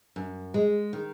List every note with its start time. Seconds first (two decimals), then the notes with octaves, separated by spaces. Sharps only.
0.16 F#2
0.54 G#3
0.93 D#3